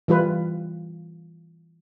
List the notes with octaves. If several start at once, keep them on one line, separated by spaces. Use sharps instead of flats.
E3 G3 F4 B4